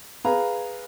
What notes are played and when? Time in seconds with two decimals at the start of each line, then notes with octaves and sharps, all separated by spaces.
0.25 G#4 B4 F5 A#5